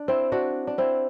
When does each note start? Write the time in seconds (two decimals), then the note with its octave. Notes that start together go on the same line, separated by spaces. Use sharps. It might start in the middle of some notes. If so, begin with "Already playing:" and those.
Already playing: D4
0.08 C4 E4
0.32 D4 F#4
0.67 D4
0.78 C4 E4